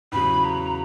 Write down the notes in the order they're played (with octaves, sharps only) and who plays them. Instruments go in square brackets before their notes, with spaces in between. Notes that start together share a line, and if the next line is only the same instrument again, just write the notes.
[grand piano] E2 C#3 F#3 [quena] B5
[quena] A#5